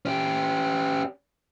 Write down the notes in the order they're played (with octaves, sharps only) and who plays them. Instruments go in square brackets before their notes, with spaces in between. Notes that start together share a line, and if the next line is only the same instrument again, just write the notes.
[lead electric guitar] C#4 G4